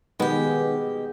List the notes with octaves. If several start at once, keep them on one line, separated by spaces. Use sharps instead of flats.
B2 D#3 G#3 B3 G4